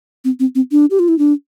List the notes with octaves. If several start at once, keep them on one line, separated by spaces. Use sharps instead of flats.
C4
C4
C4
D4
G4
F4
E4
D4